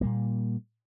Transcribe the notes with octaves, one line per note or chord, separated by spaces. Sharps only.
A#2 G3 A#3